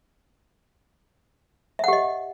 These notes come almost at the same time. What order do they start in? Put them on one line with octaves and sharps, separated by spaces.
E5 F#5 G4 D#5